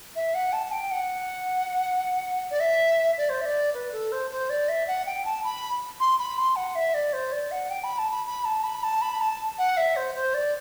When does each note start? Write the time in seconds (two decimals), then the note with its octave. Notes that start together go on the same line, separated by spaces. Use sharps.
0.16 E5
0.34 F#5
0.53 A5
0.72 G5
0.91 F#5
2.50 D5
2.60 E5
3.18 D5
3.30 C5
3.41 E5
3.46 D5
3.74 B4
3.92 A4
4.12 C5
4.31 C5
4.50 D5
4.69 E5
4.87 F#5
5.06 G5
5.25 A5
5.44 B5
6.00 C6
6.19 B5
6.38 C6
6.56 F#5
6.75 E5
6.94 D5
7.13 C5
7.32 D5
7.51 F#5
7.70 G5
7.84 B5
7.98 A5
8.11 B5
8.26 B5
8.45 A5
8.63 B5
8.83 A5
9.01 B5
9.21 A5
9.58 F#5
9.77 E5
9.96 C5
10.15 C5
10.34 D5